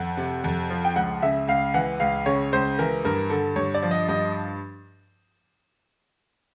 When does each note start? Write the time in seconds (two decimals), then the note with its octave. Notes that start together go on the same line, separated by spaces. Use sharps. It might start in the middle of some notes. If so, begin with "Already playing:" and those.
Already playing: F2 F#5
0.17 C3
0.44 F2
0.70 F3
0.85 G5
0.96 C#2 F#5
1.22 C#3 E5
1.48 C#2 F5
1.74 E3 F#5
2.00 C#2 F5
2.26 C#3 C#5
2.52 C#2 C5
2.79 E3 A#4
3.05 G2 A#4
3.30 D3 A4
3.56 G2 C#5
3.74 D5
3.82 F3
3.91 D#5
4.09 G2 D#5